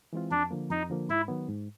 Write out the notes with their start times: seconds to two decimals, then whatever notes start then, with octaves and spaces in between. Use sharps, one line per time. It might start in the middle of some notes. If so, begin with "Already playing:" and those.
0.13 E3 G#3 C4 F4
0.31 F2 D4
0.51 D3 F3 A#3
0.70 F2 D#4
0.90 D3 F3 A#3
1.09 G#2 E4
1.28 D#3 F#3 B3
1.48 G#2